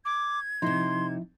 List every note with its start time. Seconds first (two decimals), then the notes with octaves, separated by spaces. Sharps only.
0.05 D6 G#6
0.62 C3 F3 D#4 E4 E5 C6